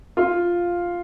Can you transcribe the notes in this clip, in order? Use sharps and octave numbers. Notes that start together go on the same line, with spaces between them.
F4